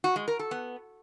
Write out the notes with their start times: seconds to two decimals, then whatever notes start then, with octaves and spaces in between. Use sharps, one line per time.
0.04 F#4
0.16 G#3
0.28 A#4
0.39 A4
0.51 B3